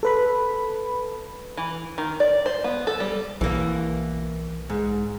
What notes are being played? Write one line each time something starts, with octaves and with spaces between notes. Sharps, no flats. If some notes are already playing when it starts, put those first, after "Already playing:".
A4 B4 B5
E3
D#3
D5
C5
B3
A4
G3
B1 E3 A#3
G#2